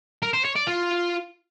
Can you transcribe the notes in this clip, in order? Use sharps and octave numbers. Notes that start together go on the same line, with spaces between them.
A#4
C5
C#5
D5
F4